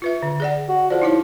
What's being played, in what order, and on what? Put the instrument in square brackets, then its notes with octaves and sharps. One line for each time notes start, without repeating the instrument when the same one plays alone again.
[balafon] F4 B4 E5
D3
G#4 D5 F#5
[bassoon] F#4
[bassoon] F3 [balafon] A4 D5
[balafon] D#4 E4 C#5